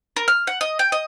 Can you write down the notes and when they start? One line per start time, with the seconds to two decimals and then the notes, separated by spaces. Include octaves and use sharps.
0.16 A#4
0.28 F6
0.47 F#5
0.61 D#5
0.79 G5
0.92 D#5